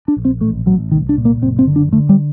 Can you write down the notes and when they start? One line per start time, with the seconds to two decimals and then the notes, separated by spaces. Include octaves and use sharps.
0.08 D4
0.16 A#1
0.25 C4
0.41 A1 A3
0.66 A1 F#3
0.92 C2 D#3
1.09 D4
1.17 A#2
1.25 A#3
1.42 F#1 C4
1.59 C4
1.67 D3
1.76 D4
1.93 D3 A3
2.09 G3